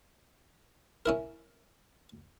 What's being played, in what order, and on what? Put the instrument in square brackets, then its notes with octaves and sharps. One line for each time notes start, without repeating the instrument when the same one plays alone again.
[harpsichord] C#4 E4 A#4